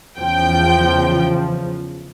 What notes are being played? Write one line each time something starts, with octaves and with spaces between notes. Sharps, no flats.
E2 C#3 F3 G5